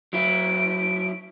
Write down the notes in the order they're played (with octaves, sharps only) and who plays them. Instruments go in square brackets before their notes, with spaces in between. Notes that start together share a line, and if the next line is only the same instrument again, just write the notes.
[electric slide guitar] F#3 E4 [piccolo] D7